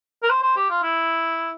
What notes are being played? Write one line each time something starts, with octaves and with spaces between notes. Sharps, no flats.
A#4
C5
C5
G4
F4
E4